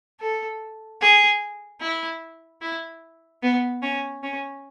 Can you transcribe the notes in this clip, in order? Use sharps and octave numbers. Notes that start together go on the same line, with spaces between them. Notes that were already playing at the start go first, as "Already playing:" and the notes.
A4
G#4
E4
E4
B3
C#4
C#4